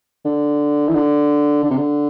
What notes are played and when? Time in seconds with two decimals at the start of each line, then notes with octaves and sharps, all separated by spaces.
0.25 D3
0.89 E3
0.95 D3
1.64 D3
1.71 C3
1.77 D3